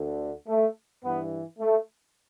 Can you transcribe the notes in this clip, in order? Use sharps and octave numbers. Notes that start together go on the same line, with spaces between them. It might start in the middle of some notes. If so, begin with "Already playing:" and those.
Already playing: D2 D3
A3
G2 E3 B3
A3